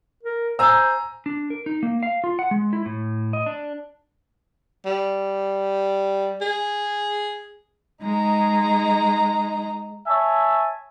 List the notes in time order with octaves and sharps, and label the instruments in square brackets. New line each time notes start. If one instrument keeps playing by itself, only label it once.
[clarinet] A#4
[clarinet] C5 [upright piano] G#5 A#5 E6
[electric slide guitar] D4
A#4
D#4
A#3
F5
F4
F#5
G#3
E4
A2
D#5
D4
[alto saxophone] G3
G#4
[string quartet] G#3 D#4 A#5
[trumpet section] C#5 E5 G#5 A5